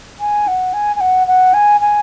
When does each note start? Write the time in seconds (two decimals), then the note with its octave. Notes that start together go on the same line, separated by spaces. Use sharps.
0.20 G#5
0.48 F#5
0.73 G#5
0.96 G#5
1.01 F#5
1.27 F#5
1.54 G#5
1.81 G#5